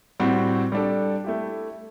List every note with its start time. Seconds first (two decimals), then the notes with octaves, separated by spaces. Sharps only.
0.20 A2 G3 C4 F#4
0.72 G3 D4 A4
1.24 A3 E4 G4